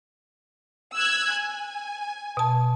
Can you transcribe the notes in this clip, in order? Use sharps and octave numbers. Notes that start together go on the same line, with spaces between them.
E6 F#6 G#6
G#5
B2 A5